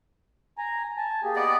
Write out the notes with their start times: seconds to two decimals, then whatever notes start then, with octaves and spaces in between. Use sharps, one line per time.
0.58 G#5 A#5
0.97 G#5 A5
1.24 A#3 G4 G#4
1.36 B3 D5 D#5